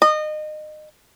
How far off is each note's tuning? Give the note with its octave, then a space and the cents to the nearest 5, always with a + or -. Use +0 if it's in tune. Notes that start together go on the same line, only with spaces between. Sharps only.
D#5 -25